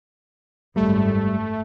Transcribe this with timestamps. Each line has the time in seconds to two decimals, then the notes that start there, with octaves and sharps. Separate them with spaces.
0.76 G#1 F#2 G3 A3